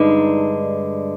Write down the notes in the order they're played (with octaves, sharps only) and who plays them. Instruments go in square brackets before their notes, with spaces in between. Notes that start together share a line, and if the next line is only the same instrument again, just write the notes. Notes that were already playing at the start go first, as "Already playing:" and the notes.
Already playing: [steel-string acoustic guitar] G2 D3 G#3 [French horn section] D#4